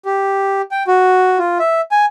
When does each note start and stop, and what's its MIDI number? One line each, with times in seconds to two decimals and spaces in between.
0.05 0.62 67
0.71 0.83 79
0.87 1.38 66
1.38 1.58 65
1.59 1.81 76
1.91 2.06 80